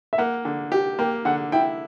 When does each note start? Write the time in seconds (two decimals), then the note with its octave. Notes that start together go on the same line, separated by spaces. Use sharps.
0.13 E5
0.18 A#3 F#5
0.45 D3
0.72 G4
0.99 A#3 G5
1.25 D3 F#5
1.52 E4 G5